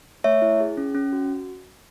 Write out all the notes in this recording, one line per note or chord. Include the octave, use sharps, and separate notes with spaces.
A3 C#5 E5
E4
G#4
C#4
C#4
F#4